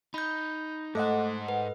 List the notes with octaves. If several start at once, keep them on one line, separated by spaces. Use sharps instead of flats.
D#4 B5 G6
G#2 A3 A4 C5 D#5 F#5
B4